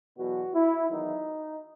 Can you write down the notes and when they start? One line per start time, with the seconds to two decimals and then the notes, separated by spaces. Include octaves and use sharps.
0.17 E2 B2 F#3 F#4
0.54 E4
0.90 E2 D#3 F#3 D#4